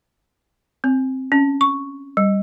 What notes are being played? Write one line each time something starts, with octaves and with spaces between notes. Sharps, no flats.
C4
C#4
C#6
G3